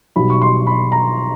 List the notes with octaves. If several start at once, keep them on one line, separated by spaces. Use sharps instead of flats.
B1 B2 G3 B5
C#6
C6
B5
A#5